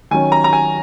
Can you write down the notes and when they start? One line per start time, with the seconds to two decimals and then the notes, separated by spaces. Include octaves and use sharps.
0.11 D#3 F#3 C#4 G#5
0.32 A#5
0.44 A#5
0.53 G#5